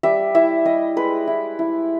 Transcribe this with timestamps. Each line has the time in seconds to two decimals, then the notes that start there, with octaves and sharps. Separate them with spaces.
0.03 G3 E5
0.35 E4 E5
0.65 G3 D#5
0.96 G#3 B4
1.27 E4
1.59 E4